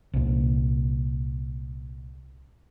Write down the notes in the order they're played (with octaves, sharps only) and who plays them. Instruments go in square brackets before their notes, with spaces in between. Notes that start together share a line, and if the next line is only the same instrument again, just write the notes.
[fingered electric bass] C2 A#2